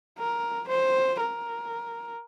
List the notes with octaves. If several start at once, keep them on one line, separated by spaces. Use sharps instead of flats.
A#4
C5
A#4